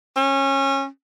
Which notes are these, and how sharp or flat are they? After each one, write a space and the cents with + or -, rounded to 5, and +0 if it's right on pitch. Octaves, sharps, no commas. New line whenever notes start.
C#4 -25